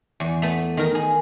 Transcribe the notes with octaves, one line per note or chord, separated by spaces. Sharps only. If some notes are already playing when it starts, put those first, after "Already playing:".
E2
A3 B3
D#3 A#4
G#4